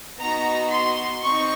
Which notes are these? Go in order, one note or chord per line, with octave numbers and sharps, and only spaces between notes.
B3 D#4 F#4 A#5
C6
C4 D#4 C#6